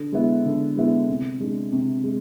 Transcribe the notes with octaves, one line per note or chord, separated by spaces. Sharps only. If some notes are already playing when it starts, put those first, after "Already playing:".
Already playing: D3
G#3 B3 E4
D3
G#3 B3 E4
C3
G#3 D4
C3
G#3